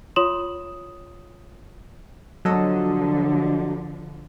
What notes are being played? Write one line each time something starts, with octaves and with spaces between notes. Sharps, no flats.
F4 C#5 C6 D#6 E7 F#7
D3 F3 F#3 A4 D#5